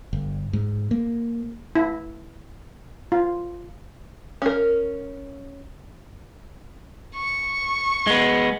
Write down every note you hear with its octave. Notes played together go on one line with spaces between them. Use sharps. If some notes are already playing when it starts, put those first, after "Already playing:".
G1
G#2
A#3
E4
F4
C#4 A#4
C#6
G#3 B3